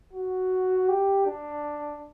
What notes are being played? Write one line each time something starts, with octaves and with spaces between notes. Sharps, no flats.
F#4
G4
D4